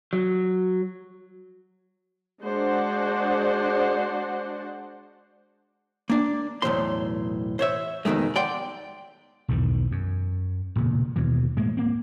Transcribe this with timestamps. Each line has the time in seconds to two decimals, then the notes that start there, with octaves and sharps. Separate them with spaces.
0.13 F#3
2.42 G#3 D4 F#4 C5 D5 F#5
6.10 A#3 D4
6.62 B1 E2 A2 F#3 C5 C6
7.59 C5 C#5 E5
8.05 F2 B2 D#3 G#3 A3
8.36 D5 F#5 G5 C6
9.48 B1 E2 G#2 D#3
9.92 F#2
10.76 E1 A#2 C#3
11.16 D#2 B2 E3
11.57 A2 G#3 A#3
11.77 A#3 C4